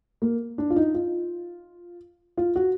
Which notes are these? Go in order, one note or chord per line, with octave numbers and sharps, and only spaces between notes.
A#3
D4
F4
D#4
F4
F4
F#4